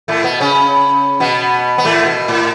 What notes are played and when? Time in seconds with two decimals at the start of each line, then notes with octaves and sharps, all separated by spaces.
0.08 A2 A3
0.24 B2 B3
0.40 C#3 C#4
1.20 B2 B3
1.78 B3
1.85 A2 A3
2.06 B2
2.28 A2